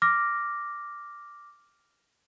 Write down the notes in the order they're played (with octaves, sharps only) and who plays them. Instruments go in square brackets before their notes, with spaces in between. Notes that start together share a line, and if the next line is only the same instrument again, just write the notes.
[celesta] D6 F6 A#6